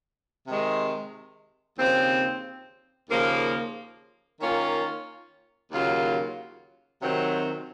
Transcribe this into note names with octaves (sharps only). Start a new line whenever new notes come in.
C3 D#3 G#3
D#2 C#3 F3 C4
D#2 C#3 F3 A#3
D#3 A#3 C#4 F4
D#2 C#3 F#3 A#3 F4
C3 D#3 F#3 C4